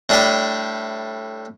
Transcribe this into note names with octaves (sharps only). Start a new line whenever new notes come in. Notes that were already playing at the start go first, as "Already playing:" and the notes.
A2 G3 D4 G4